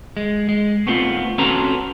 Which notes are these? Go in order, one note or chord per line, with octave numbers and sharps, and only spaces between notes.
G#3
G#3
A3 B3 C4 F4
C4 C#4 F#4 A4 B4 A#5